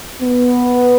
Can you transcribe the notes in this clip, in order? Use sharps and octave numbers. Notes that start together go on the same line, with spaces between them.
B3